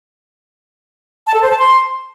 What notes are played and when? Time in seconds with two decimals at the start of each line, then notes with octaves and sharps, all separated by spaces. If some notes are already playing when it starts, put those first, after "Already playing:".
1.26 A5
1.34 A4
1.42 C5
1.50 A5
1.58 C6